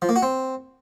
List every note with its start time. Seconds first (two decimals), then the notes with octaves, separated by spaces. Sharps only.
0.02 F3
0.09 A#3
0.16 F#4
0.23 C4